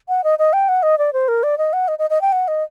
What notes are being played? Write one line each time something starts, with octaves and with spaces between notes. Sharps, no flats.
F#5
D#5
D#5
G5
F#5
D#5
D5
C5
A#4
D5
D#5
F#5
D#5
D#5
D#5
G5
F#5
D#5